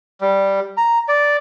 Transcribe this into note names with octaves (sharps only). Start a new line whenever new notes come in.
G3
A#5
D5